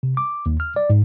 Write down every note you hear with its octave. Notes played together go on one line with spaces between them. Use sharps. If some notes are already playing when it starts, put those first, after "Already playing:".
C3
D6
D#2
F6
D5
G#2